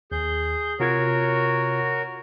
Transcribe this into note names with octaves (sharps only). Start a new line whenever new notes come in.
D#2 G#4 G6
C3 F4 F#4 A#4 C#5 G#6